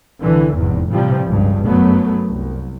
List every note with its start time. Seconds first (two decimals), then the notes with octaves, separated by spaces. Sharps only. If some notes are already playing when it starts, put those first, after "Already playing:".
0.22 C2 D3 E3
0.57 F1 E2 G#2
0.90 A2 C3 E3 F3 G3
1.26 G1 C#2 G2
1.66 F#2 F#3 A3 B3
2.29 C2